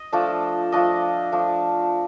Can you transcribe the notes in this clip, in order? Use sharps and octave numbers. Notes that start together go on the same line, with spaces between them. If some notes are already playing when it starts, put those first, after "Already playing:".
Already playing: D#5
F3 A3 D4
F3 A3 D4 D#5
F3 A3 D4